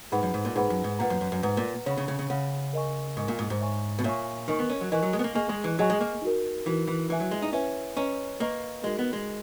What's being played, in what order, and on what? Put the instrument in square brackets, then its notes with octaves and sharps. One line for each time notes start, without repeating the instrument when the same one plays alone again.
[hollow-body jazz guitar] G#2 [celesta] D#4 G#4 B4 F#5 B5
[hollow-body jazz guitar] F#2
G#2
A#2
[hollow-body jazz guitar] G#2 [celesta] D#4 G#4 B4 F#5 B5
[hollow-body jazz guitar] F#2
G#2
[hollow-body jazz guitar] A#2 [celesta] B4 F#5 A#5
[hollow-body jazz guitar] F#2
F#2
F#2
[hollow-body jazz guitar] G#2 [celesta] B4 F#5 A#5
[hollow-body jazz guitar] A#2
[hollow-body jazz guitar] C#3 [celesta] C#5 F#5 B5
[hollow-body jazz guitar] C#3
C#3
C#3
[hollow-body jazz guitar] C#3 [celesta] C#5 F#5 B5
[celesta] A#4 D#5 G#5 C#6
[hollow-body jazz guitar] G#2 [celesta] A#4 D#5 G#5 C#6
[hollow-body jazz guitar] A#2
G#2
G#2
[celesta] C#5 E5 G#5 C#6
[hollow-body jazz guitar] B2
[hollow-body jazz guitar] A#2 [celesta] C#5 E5 G#5 C#6
[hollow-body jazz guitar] D#3 [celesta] A#4 D#5 G#5 C#6
[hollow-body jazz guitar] B3
C#4
F#3
[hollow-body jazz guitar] E3 [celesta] A#4 D#5 G#5 C#6
[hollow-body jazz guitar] F#3
G#3
B3
A#3
[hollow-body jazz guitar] A#3 [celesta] G#4 D#5 G#5 C#6
[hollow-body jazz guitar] G#3
E3
[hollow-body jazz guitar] F#3 [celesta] G#4 D#5 G#5 C#6
[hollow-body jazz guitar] G#3
A#3
[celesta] D#4 F#4 A#4
[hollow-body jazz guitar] E3 [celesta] D#4 F#4 A#4
[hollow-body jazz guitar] E3
[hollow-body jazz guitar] E3 [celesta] E4 B4 E5 G#5
[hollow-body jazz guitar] F#3
G#3
D#4
[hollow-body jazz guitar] C#4 [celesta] E4 B4 E5 G#5
[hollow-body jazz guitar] C#4 [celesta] B4 D#5 A#5 C#6
[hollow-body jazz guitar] A#3 [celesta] B4 D#5 A#5 C#6
[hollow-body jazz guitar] G#3 [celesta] D#4 F#4 A#4 D#5
[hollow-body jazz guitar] B3
G#3